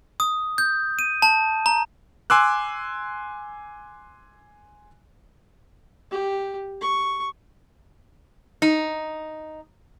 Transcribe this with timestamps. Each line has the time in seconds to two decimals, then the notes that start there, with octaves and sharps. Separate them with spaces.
0.20 D#6
0.58 G6
0.99 D#7
1.22 A5
1.66 A#5
2.30 G#5 C6 D6 E6 F#6
6.11 G4
6.81 C#6
8.62 D#4